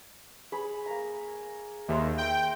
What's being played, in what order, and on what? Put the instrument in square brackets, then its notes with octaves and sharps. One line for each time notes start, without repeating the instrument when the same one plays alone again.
[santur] G#4 C#5 B5
A#3 A#5
[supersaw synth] D#2 [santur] E5 A#5 C6
[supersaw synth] G5 [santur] E6